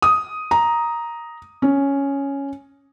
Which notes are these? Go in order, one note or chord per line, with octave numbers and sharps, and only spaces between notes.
D#6
A#5
C#4